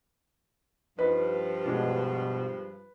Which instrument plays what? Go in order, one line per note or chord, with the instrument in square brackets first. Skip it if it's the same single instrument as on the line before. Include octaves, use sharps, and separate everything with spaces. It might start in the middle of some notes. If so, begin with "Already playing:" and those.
[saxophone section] G2 F3 [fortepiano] D#4 [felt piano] B4
[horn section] B2 [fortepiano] G#3 D4 F4